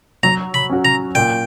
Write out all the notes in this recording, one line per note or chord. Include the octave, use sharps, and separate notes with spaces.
F#3 A#5
B5
C#4 F#4
A#5
A#2 G5